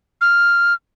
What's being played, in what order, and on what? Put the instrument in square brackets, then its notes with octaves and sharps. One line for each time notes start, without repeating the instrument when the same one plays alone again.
[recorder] F6